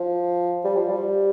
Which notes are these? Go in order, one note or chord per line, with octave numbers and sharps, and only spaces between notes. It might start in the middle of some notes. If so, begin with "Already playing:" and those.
Already playing: F3
G3
F3
G3